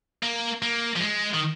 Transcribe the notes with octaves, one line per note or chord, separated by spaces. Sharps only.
A#3
A#3
F3
G#3
D#3